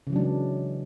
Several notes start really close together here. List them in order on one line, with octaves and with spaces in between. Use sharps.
C#3 E3 F#3 D4 G#3